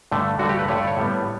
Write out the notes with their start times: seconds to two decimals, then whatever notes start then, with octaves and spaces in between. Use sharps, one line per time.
0.12 G2 D3 A3
0.39 G2 D3 A3 F#4
0.49 G4
0.59 B4
0.68 G2 D3 A3 C#5
0.78 D5
0.87 C#5
0.97 A2 G3 B3